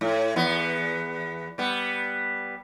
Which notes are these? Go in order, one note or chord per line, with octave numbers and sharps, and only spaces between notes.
A2
E2 B3
G3 B3